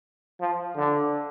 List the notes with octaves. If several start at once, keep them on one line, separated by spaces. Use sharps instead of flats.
F3
D3